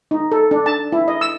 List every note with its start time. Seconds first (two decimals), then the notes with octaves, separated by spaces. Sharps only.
0.11 D#4
0.32 A4
0.51 D4
0.66 A5
0.92 E4
1.08 D#5
1.21 E6